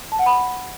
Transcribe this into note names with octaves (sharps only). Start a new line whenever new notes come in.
A5
F#5
B5